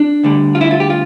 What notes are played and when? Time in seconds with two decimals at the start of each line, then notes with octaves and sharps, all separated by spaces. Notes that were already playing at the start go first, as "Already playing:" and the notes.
Already playing: D4
0.24 D2 D3 G3
0.55 F4
0.61 E4
0.71 F4
0.80 G4
0.90 F4